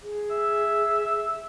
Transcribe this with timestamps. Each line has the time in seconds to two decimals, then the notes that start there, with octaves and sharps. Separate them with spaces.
0.03 G#4
0.30 E5